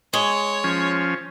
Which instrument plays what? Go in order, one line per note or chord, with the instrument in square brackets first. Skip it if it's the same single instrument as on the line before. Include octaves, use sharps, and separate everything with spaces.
[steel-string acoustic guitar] G#3 [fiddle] C#5
[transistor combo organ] F3 C#4